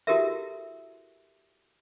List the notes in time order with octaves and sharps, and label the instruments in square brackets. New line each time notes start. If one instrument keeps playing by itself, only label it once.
[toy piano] E4 F#4 G4 A4 A#4 E5